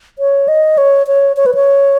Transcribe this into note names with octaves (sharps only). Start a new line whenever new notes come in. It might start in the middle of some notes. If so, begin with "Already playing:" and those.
C#5
D#5
C#5
C#5
C#5
B4
C#5